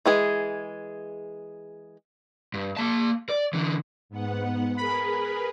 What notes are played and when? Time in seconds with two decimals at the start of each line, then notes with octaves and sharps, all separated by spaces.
0.06 E3 G#3 G#4
2.54 G2
2.77 A#3 A5
3.29 D5
3.53 D3 E3
4.09 G#2 B3 F#5
4.77 G#4 A#4 B4 B5